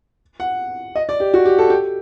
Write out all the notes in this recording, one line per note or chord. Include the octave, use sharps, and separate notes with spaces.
F#5
D#5
D5
G4
F#4
G4
A4
G4